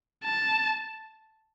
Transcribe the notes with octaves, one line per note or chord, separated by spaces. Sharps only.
A5